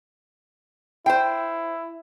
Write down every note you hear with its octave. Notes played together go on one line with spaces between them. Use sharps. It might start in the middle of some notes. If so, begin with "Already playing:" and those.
E4 C5 G5